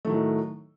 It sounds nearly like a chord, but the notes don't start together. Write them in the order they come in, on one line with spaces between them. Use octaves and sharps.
A3 D#3 F#3 A2